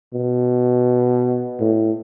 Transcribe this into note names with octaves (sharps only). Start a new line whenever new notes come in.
B2
A2